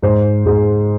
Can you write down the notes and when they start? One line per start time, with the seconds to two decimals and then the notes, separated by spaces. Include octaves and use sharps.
0.02 G#2 C5
0.45 G#2 G#4